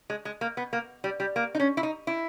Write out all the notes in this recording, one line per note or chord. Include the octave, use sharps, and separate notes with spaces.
G#3
G#3
A#3
B3
A#3
G3
G3
A#3
D#4
C#4
E4
D#4
E4